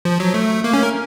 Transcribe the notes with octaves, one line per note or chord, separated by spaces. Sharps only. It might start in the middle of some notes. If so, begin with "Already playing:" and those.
F3
F#3
A3
A#3
C#4
A#4